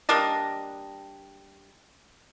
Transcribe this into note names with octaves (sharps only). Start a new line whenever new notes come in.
G3 A#3 D4 D#5